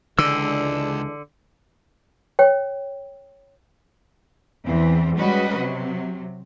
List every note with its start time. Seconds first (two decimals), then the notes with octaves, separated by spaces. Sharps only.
0.19 C#2 D3 E3 G#3 D4 E6
2.39 C#5 G5
4.65 E2 E3 C4
5.16 G3 G#3 C#4 F#4 B4 D#5
5.56 C3 F#3